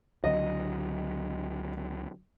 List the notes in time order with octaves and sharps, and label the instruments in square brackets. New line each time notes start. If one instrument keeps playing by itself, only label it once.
[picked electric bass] C#2 D3 F#3 [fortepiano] D#5